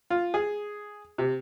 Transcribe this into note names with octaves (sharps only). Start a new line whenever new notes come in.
F4
G#4
C3